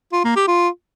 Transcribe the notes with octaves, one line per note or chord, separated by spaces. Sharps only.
F4
A#3
G4
F4